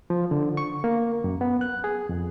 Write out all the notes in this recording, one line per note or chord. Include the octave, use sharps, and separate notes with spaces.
F3
D3
C#6
A#3
F#2
B3
F#6
G#4
F2